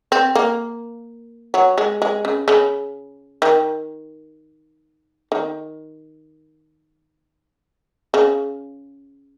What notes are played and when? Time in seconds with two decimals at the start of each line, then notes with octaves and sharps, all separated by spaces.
0.12 C4
0.35 A#3
1.54 F#3
1.78 G#3
2.02 G#3
2.25 C#3
2.48 C#3
3.42 D#3
5.32 D#3
8.14 C#3